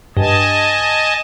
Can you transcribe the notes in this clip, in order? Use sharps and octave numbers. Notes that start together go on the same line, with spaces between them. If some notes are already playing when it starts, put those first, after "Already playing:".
G2 D#5 G#5 A5